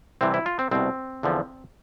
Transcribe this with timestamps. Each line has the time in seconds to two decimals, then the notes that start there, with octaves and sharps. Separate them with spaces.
0.21 C2 C3 E3 C4
0.34 E4
0.46 F4
0.59 C4
0.71 C2 B2 C4
1.23 E2 D3 F3